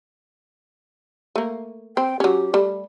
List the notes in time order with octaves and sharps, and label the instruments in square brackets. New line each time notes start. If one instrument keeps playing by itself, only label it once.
[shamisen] A3 A#3
[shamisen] C4 [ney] G5
[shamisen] F#3 C#4 [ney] G4
[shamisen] G3 A3